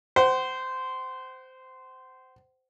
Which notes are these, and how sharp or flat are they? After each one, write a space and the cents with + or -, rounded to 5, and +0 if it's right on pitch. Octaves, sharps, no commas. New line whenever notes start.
C5 -15 F#5 +40